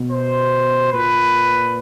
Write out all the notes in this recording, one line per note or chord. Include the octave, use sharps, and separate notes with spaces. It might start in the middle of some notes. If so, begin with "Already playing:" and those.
Already playing: B2
C5
A#2 B4